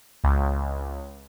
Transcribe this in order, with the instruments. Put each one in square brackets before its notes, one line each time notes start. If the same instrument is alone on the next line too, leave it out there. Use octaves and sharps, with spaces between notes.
[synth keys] C#2